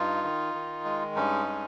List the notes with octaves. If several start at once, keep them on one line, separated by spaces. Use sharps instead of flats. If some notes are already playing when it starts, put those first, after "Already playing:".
Already playing: G2 D#4 F4
D#3
D#3
G#3
G2 C#4 D#4
G#3